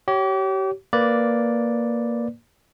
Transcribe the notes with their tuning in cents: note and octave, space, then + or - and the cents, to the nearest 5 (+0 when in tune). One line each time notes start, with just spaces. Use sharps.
G4 -35 C#5 +0
A#3 +0 B4 -5 D5 +0